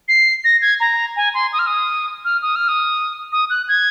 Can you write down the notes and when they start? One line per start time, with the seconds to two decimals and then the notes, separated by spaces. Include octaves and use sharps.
0.08 C7
0.44 A#6
0.62 G#6
0.80 A#5
1.16 G#5
1.34 C6
1.53 D#6
1.59 F6
1.67 D#6
2.25 F6
2.42 D#6
2.56 F6
2.68 D#6
3.32 D#6
3.50 F#6
3.69 G#6